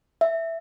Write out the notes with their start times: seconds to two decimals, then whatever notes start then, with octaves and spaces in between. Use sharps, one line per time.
0.21 E5